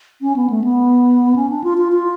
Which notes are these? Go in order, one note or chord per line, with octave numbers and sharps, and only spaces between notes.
C#4
B3
A3
B3
C#4
D4
F4
F4
F4